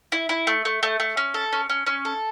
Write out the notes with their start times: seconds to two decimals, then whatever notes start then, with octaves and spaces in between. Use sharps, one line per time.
0.12 E4
0.29 E4
0.47 A3
0.65 A3
0.83 A3
1.00 A3
1.17 C#4
1.34 A4
1.53 C#4
1.70 C#4
1.87 C#4
2.05 A4